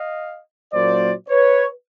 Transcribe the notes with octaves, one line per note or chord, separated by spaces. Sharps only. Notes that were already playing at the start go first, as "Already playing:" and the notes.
Already playing: D#5 F5
A#2 F#3 A#3 C#4 C5 D5
B4 C#5